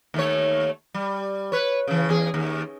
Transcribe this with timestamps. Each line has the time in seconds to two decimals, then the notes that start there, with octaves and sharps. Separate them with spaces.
0.14 D#2 A3 C#5
0.94 G3
1.52 B4 C#5
1.88 C#3 E3
2.09 E2 G#4
2.34 D#2